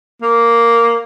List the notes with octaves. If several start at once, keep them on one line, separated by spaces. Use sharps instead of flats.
A#3